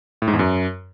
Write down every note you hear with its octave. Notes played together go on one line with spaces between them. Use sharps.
A2
G#2
E2
F#2